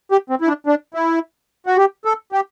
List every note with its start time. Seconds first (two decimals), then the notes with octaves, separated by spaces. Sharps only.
0.12 G4
0.30 C4
0.41 E4
0.48 D4
0.67 D4
0.94 E4
1.66 F#4
1.77 G4
2.05 A4
2.32 G4